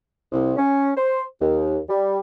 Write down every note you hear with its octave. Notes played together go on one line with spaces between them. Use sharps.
C2
C#4
C5
D#2
G3